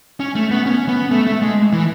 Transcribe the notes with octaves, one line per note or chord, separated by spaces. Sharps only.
C#4
A3
B3
C#4
B3
A3
A3
G#3
E3